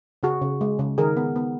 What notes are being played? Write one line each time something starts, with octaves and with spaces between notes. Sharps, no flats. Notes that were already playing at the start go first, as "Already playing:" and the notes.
C#3 F#4 G#4
C#3
G#3
C#3
D#3 G#4 A#4
B3
B3